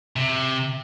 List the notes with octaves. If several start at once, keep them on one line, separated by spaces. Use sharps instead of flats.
C3